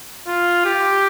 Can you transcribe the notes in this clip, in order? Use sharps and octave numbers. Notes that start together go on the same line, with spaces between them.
F4
G4